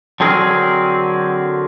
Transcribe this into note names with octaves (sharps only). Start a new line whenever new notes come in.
D3 F#3 C4 G#4 A#4